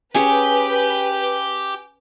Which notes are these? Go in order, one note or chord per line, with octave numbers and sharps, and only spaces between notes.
C#4 G4 G#4 B4 G#5